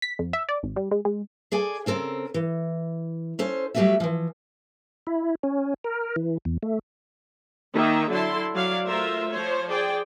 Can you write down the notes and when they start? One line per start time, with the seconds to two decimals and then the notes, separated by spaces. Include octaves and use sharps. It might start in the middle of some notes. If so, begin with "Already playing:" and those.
0.02 B6
0.19 F2
0.33 E5
0.49 D5
0.63 G#1
0.76 G3
0.91 G#3
1.05 G#3
1.52 G#4 A4 D5 G#5
1.86 C#3 C4 A4 A#4
2.34 E3
3.39 C#4 A4 C5
3.74 F#3 G3 A3 D#4 F#4 E5
4.00 E3 F3
5.07 E4
5.43 C#4
5.84 A#4
6.16 E3
6.45 E2
6.63 A3
7.73 D#3 A#3 D#4 E5
8.11 D3 F#3 E4 A5 C6
8.54 F#3 D5 F5
8.86 A3 F4 A#4 C5 E5
9.31 F3 C5 C#5
9.70 G#4 C5 D5 G5